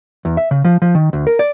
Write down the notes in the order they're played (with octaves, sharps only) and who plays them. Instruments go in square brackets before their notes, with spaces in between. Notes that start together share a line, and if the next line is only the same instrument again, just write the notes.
[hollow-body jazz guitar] E2
E5
C#3
F3
F3
D#3
D2
A#4
D5